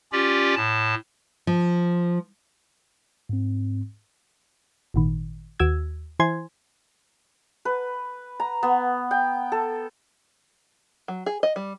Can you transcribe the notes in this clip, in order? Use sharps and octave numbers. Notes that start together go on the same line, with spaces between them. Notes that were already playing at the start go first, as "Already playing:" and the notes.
C#4 F4 G4 D5
A2 A5
F3
G#2 C4
G#1 A#2 D#3
D#2 F#4 E6 G#6
E3 E4 C5 G#5 C6 G#6
B4
A#5
B3
G5
A4
F#3
G#4
D#5
G3